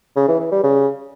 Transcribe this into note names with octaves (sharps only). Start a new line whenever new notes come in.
C#3
E3
E3
G3
C#3